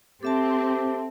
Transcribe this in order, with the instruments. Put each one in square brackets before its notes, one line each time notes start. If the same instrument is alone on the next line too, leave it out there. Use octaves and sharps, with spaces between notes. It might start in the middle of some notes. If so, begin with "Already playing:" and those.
[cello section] C4 [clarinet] G4 [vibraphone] A4 E5 A5